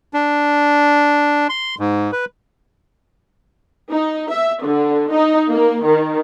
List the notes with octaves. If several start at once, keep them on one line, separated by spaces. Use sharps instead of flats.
D4
C6
G#2
B4
D#4
E5
D3
D#4
A#3
D#3